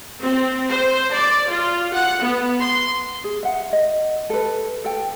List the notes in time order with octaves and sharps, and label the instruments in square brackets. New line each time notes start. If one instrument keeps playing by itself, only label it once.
[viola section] C4
C5
D5
F4
F#5
B3
C6
[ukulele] G#4
E5 F#5
D#5
A4 B4
A4 G5